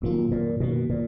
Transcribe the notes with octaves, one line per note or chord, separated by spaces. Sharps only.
F2 A#2 D#3 F#3 A#3 F4
A#2
F#2 B2 D#3 A#3
A#2